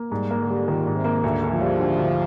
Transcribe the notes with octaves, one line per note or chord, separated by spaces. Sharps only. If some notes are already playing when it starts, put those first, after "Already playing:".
Already playing: A#3
G#2 G3
A#3
D3
G3
A#2 D#3
G#2
C3
A#3
D2 D3
A#3
F3
G3
D3
D2